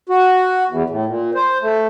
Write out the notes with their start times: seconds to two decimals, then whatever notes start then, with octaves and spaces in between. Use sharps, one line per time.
0.09 F#4
0.69 E2
0.90 A2
1.06 A#2
1.34 C5
1.61 A3